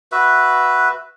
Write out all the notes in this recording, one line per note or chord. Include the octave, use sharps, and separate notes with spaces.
F#4 B4 E5